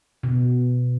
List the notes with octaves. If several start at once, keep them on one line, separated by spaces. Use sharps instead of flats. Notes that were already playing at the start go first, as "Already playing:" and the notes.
B2